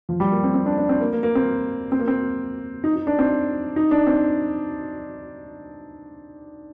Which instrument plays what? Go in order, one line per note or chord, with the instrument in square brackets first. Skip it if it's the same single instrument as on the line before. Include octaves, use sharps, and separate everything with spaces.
[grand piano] F3
G3
A#3
C4
C4
D4
D4
C4
A#3
A#3
A#3
C4
C4
A#3
C4
D#4
D#4
D4
C4
D#4
D4
C4